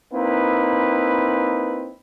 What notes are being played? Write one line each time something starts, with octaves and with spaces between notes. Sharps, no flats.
A#3 C4 D#4 E4 B4